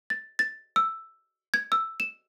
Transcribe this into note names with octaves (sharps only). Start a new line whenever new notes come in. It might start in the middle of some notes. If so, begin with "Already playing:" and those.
A6
A6
E6
G#6
E6
E7